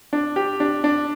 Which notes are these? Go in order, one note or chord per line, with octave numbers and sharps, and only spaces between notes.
D4
G4
D4
D4